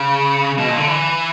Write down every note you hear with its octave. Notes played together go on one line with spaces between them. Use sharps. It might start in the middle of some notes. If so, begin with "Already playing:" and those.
Already playing: C#3
B2
A#2
D3
E3